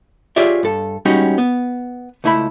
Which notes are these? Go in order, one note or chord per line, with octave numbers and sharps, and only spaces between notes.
F4 G4 G#4 C#5 D5 E5
G2 A4
G3 G#3 C#4 D#4 F#4
B3
C#2 A3 E4 E5 B5